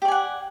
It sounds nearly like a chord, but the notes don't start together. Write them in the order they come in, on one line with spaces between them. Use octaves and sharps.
G4 D5 G#5 F#5